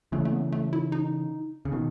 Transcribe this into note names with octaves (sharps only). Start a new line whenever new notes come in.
C#3 E3 A3
A3
B3
A3
E4
D#4
C#3
B2 D#3